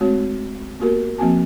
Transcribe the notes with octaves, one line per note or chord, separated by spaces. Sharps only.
G#3 A3 C4 F#4 C#5
A#3 B3 F#4 G4 A#4
F3 A#3 C4 F#4 G#5 A5